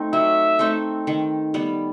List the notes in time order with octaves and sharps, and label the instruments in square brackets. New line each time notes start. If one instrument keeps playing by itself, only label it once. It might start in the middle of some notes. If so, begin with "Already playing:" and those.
Already playing: [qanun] A3 C4 D#4
[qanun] F#3 [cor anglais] E5
[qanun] A3 C4 D#4
D#3
G3 B3